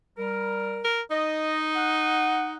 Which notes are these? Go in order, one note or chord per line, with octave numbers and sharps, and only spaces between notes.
G3 A#4
A#4
D#4 D#5
F#5